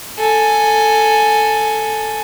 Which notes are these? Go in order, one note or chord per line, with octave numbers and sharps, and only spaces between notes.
A4 G#5